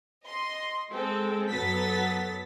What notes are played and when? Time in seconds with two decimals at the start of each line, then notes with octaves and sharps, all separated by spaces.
0.25 D#5 C6
0.90 G#3 C4 A4
1.49 F#2 F#3 B3 A4 A6 B6